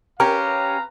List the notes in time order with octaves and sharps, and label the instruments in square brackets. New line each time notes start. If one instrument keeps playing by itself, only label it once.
[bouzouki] C#4 G4 [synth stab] A#4 [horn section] B4 F5 A#5